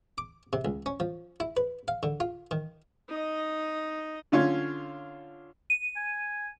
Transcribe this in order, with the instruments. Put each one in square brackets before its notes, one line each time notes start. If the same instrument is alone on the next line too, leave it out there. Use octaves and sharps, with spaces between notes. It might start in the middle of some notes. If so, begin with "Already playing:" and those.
[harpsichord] D6
C3
C#2
C#4
F3
E4
B4
F5
D3
F4
D#3
[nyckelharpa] D#4 D#5
[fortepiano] D3 C#4 F4 C#5
[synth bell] D#7
[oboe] G#5